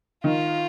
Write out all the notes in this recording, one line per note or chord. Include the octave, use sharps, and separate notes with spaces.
D#3 F4